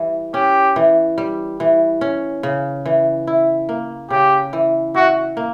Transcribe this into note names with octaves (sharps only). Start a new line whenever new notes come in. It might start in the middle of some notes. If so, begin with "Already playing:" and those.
Already playing: E3 G3
C#4 G4
E3
G3
E3
C#4
C#3
E3
E4
A#3
C#3 G4
E3
E4 F#4
A#3